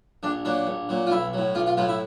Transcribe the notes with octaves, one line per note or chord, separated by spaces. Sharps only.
A#1 D4
A#2 F#3 D4
A#1
A#2 F#3
F4
B1 E4
A2 F#3
B1 F4
F4
A2 F#3 F4
E4